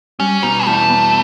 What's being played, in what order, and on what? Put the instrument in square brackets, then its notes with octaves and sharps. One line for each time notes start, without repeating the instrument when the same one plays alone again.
[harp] G3 [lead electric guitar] C#4
[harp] B2 [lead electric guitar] D#4
[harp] E2 [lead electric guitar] A3
[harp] B3